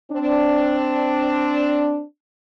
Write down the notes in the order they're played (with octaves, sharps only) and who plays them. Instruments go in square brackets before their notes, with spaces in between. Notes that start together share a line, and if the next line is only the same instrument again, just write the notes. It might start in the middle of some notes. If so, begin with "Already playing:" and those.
[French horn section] C4 D4